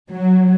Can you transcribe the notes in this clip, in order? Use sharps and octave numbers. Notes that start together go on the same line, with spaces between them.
F#3